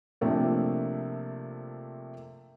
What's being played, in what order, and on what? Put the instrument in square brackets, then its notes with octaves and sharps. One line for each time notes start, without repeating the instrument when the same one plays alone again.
[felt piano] C3 F3 A3 A#3 D4